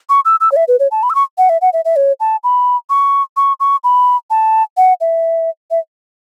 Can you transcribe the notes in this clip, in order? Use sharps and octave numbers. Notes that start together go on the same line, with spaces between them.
C#6
E6
E6
C#5
E5
B4
C#5
A5
B5
E6
C#6
F#5
E5
F#5
E5
E5
C#5
A5
B5
C#6
C#6
C#6
B5
A5
F#5
E5
E5